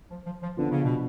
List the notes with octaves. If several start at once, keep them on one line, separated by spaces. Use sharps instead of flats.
F3
F3
F3
D3 F3 B3 D4
C#3
B2